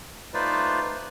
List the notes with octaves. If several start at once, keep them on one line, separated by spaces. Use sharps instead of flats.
A3 D#4 F4 B4 C5 D5